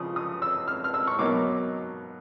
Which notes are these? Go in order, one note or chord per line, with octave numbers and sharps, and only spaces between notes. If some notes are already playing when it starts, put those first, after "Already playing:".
Already playing: C#3 F3 D#6
D#6
E6
F6
F6
E6
C#6
B2 F#3 A#3 D#4 D6